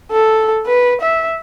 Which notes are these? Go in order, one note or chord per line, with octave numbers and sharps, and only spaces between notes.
A4
B4
E5